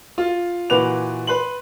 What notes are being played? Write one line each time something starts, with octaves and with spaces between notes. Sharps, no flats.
F4
A#2 E3 F#4 B4 D6 F7
B4 C6 F#7